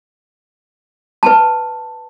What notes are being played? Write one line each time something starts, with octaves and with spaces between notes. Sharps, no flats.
B4 A5